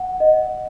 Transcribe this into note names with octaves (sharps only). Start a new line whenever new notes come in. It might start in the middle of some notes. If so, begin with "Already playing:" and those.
Already playing: F#5
D#5